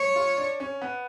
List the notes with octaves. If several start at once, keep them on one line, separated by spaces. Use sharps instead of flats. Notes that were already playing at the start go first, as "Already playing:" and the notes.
Already playing: C#5
F4
D4
C#4
B3